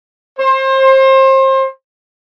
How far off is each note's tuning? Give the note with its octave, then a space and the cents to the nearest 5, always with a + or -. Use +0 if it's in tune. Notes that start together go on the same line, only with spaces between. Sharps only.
C5 +30